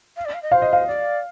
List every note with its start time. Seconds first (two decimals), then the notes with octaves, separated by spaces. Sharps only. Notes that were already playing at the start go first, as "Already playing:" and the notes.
0.16 F5
0.25 D5
0.34 F5
0.42 D#5
0.52 C5 F5
0.62 D#5
0.73 F5
0.87 D5